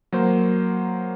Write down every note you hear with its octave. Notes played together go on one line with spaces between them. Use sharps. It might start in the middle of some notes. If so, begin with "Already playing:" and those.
F#3 A#3 C5